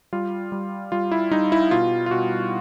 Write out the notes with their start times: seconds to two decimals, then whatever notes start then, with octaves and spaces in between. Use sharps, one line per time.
0.13 G3 F4
0.52 G3
0.92 G3 F4
1.12 E4
1.31 G3 D#4
1.52 E4
1.71 B2 F4
2.06 F4
2.11 B2 F#4